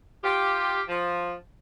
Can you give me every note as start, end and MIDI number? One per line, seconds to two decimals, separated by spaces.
0.24 0.82 65
0.24 0.82 67
0.88 1.33 53